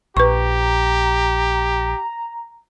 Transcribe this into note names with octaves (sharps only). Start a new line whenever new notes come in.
A#1 G4 B4 A#5 C#6